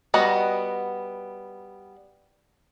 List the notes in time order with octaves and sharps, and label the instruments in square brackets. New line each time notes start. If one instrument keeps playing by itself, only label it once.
[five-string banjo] G3 B3 F#4 D#5